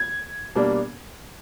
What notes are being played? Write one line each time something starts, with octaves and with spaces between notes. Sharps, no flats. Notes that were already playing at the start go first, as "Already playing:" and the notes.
Already playing: G#6
B2 G3 A#3 D4